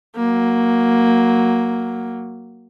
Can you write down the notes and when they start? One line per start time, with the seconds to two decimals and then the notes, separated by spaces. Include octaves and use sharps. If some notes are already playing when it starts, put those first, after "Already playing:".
0.16 F#3 A#3